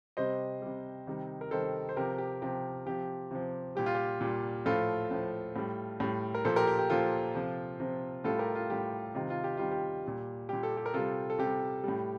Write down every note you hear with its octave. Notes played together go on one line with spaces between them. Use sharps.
C3 G3 C5 D#5
C3 G3
C3 D#3 G3
A#4
C3 D#3 G3 A4 C5
C5
C3 F3 G4 A#4
G4
C3 F3 G4
C3 F3 G4
C3 F3
A#2 G3 G4
F4
G4
A#2 G3
A2 F3 F4 A4
A2 F3
A2 G3
A2 G3
A#4
A#2 F3 A4 C5
G4 A#4
G4
G4
A#2 F3 F4 A4
C3 F3
C3 F3
A2 G3 F4 A4
G4 A#4
F4
A2 G3 G4
C3 D#3 G3 F4
F4
G4
C3 D#3 G3 F4
G4
A#2 G3
A#2 G3 G4
A4
G4
A#4
C3 G3 F4 A4
A4
C3 G3 G4
A2 G3